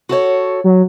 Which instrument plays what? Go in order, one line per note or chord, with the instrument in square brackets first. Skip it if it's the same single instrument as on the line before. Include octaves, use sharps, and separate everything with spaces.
[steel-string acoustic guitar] F#4 A4 C#5
[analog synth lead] F#3